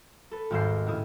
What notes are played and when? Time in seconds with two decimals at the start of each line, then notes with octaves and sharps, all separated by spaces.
0.31 A4 B4
0.50 G#1 D#2 G#2 E6 G6 C7
0.87 A2 C#3 E4 D#6